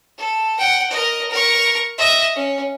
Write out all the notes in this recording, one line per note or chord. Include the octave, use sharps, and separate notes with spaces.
A4
F#5 G5
A#4 D#5
A#4 C#6
D#5 E5
C#4